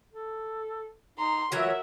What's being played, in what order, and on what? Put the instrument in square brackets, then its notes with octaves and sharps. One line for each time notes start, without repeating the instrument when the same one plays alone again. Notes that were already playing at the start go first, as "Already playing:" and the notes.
[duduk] A4
[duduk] D#4 [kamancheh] A#5 C6
[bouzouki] E3 F#3 C#5 [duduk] F4 [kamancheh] F#4 [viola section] A#4 E5